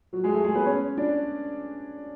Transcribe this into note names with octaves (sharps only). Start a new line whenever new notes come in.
F#3 F#4
G#3 G#4
A3 A4
G#3 G#4
B3 B4
C#4 C#5
D4 D5